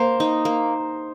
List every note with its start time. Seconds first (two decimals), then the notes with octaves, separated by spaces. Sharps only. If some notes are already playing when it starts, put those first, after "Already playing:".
Already playing: A#3 C5
0.20 D#4
0.45 A#3